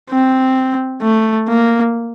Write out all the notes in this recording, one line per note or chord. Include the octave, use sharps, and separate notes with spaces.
C4
A3
A#3